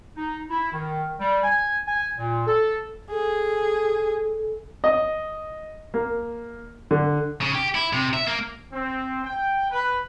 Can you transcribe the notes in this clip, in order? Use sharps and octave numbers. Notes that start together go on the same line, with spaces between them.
D#4
E4
D#3
G3
G#5
G#5
A#2
A4
G#4 A4
D#5
A#3
D3
C#3
G4
E4
C3
E5
A#3
C4
G5
B4